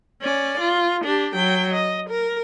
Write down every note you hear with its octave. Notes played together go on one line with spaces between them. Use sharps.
C#4 D5
F4
D4 G4
F#3 G5
D#5
A#4